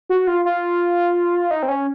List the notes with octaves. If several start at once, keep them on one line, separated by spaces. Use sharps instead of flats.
F#4
F4
F4
D#4
C4
C#4